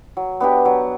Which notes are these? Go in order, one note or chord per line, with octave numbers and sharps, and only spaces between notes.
F#3
B3 D4 G4
F#3